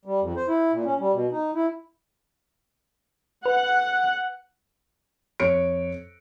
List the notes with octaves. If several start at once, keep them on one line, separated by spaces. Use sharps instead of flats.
G3
F2
C5
E4
A#2
C#4
G3
B2
D#4
E4
B4 F#5
F2 C#5 C#7 D7